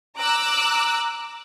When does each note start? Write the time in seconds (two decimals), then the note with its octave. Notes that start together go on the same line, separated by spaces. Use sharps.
0.17 A#5 D6 E6 F#6